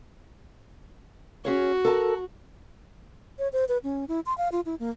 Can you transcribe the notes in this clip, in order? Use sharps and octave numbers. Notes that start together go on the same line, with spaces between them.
C#4 F#4 G#4 C#5
A4 A#4 A5
C#5
C5
B4
C#4
E4
C6
F5
F4
E4
A#3